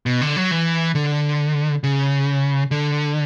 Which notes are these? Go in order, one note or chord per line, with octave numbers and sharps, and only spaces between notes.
B2
D3
F#3
E3
D3
C#3
D3